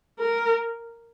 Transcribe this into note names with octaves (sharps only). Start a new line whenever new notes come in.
A#4